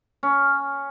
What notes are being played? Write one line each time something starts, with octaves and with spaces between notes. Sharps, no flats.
C#4